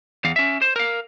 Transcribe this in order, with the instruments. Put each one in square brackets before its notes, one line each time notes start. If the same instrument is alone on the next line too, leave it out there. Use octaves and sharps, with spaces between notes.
[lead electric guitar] E2 F5
C#4 E5
C5
A#4 F5